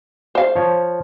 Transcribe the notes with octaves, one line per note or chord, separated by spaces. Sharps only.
C5 F5
F3 C#5